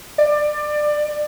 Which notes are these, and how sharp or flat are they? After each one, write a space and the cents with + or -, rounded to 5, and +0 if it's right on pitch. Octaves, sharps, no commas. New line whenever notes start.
D5 +20